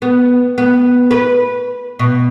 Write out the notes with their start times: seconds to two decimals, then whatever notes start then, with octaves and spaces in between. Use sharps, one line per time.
0.02 B3
0.58 B3
1.11 B4
1.99 B2